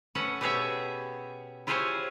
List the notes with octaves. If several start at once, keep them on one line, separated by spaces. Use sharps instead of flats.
C#4 A4 B4 F#5
B2 B3 G4 G#4 C#5 E5
E4 F4 G4 G#4 C5 C#5